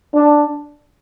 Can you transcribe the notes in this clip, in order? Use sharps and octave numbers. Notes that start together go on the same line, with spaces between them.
D4